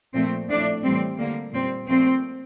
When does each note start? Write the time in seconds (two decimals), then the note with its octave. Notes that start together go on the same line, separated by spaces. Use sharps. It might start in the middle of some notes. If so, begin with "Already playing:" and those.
0.14 A#2 F3 A3 C4
0.49 A2 F3 A3 D4
0.84 A2 E3 G3 C4
1.19 D3 G3 A#3
1.53 A#2 G3 C4
1.88 A#2 F3 A3 C4